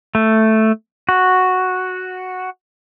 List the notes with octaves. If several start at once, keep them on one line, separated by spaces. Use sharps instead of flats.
A3
F#4